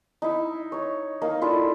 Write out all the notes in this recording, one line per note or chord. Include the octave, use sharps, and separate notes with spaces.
D#4 E4 E5
D#4 C#5
A#3 D#4 F5
D4 E4 F4 A4